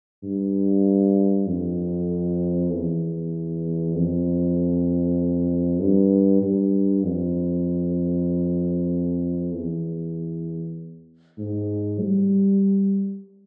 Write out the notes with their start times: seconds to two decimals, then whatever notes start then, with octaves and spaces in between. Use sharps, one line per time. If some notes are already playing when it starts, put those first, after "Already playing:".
0.23 G2
1.47 F2
2.71 E2
3.95 F2
5.81 G2
6.42 G2
7.05 F2
9.53 E2
11.38 G#2
12.01 G3